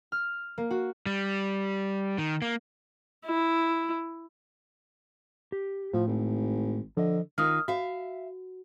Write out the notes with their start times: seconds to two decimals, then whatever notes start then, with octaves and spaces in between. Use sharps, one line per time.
0.12 F6
0.58 A#3
0.71 F#4
1.06 G3
2.18 D#3
2.42 A#3
3.26 E4
5.52 G4
5.93 A2 F3
6.07 G#1
6.97 D3 F3 D#5
7.38 D#3 D#4 F4 D#6 F6
7.68 F#4 E5 F5